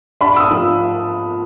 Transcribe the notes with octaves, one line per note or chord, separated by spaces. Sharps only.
D4 B5
E6
D#6
F3